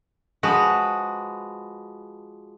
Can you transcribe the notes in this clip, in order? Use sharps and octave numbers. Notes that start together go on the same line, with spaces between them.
F3 G#3 F#4 B4